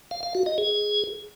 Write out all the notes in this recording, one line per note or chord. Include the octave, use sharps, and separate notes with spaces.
F5
F5
F#4
D#5
G#4